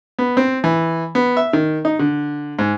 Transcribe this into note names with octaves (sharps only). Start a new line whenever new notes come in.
B3
C4
E3
B3
E5
D#3
D#4
D3
G#2